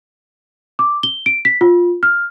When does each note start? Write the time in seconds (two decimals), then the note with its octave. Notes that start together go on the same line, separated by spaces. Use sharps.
0.79 D6
1.03 G7
1.26 D7
1.45 B6
1.61 F4
2.03 F6